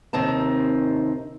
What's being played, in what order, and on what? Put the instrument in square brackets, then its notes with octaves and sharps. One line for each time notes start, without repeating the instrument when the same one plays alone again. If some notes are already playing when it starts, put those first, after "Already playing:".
[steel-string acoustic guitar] D#2 C3 D#3 C4 D#4 A5